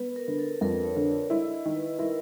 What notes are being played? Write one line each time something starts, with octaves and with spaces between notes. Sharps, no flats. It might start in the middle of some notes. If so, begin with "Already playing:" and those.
Already playing: B3 B4
A#4
D3
A4
F2 A#4
C#5
D3
D5
E4 D#5
D#5
D#3
B4
E4 A#4